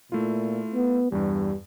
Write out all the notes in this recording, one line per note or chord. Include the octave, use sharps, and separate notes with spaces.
A#2 A3 E4 F4
B3
E2 G2 G3